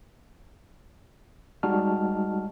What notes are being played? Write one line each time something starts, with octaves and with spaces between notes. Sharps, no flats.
G3 G#3 D#4 F#4 A5 F6